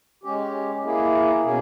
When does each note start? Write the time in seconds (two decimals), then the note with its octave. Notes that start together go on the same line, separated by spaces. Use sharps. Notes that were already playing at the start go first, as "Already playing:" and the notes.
0.24 G#3 C#4 G4
0.83 A#3 E4 G#4
1.42 B2 A#3 C#4 G#4